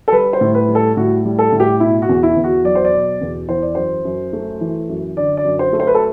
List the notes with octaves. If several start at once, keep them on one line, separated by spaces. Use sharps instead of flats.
A4
G3 B4
C5
A2
B4
G3
A4
A2 F#4
G3
A4
A2
G4
B2 E4
F#4
E2
E4
E2
F#4
F#3 D5
C5
D5
B2
E2
E3 C5
D5
F#2 C5
F#2
A3
E3
F#2
D3 D5
D5
F#2
C5
A3
C5
B4
A4